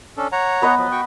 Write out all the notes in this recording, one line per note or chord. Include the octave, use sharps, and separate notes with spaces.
C#4 D4 A4
C#5 F#5 A#5
B3 B4 D#5
F3 F#3
F#4 G5 C#6